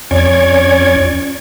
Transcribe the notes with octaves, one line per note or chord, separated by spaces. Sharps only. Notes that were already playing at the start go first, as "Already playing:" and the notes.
F2 C#4 C#5 D5 G#6